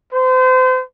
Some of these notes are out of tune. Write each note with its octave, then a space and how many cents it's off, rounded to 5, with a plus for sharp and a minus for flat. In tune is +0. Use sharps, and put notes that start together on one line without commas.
C5 -35